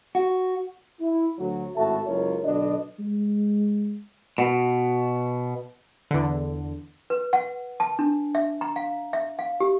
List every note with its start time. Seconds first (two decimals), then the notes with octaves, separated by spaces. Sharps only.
0.15 F#4
1.01 E4
1.38 D2 F#3
1.76 G#1 A2 F#4 A4 E5 A5
2.07 F#1 C#2 F4 A#4 C#5
2.44 B1 B2 D3 D4 D#5
3.00 G#3
4.38 B2
6.11 E2 D3
7.10 B4
7.33 F#5
7.80 A5
7.99 D4
8.35 E5
8.61 A#5
8.76 F5
9.13 E5
9.39 F5
9.60 G4